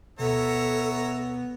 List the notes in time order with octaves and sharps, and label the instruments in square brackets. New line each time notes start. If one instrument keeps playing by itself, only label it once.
[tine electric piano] D2 B2 [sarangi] B3 [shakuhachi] A4 [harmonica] C#5 E5 A#5